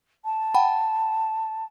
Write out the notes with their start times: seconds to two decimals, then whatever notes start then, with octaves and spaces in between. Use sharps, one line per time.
0.25 A5
0.54 F#5 G5 B5